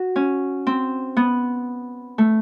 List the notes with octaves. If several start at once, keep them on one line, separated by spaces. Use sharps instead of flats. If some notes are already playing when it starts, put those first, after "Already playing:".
Already playing: F#4
C#4
C4
B3
A3